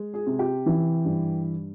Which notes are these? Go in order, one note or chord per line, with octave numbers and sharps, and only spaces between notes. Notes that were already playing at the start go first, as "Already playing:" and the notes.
Already playing: G#3
G#4
C3
G4
E3
G2